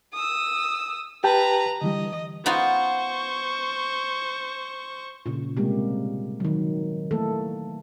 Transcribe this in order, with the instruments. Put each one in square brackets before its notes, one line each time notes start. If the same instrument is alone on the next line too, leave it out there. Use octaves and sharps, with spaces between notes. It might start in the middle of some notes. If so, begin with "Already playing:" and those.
[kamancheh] D#6 E6
[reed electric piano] G4 G5 A5 [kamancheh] B4 A#5
[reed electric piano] D3 E3 G3 [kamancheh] D#5
[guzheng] B3 D#4 F4 [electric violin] C5 C#6
[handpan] A#2 C#3
C3 G3 G#3 A#3 G4
D#3 F#3
E3 A3 A#3 A4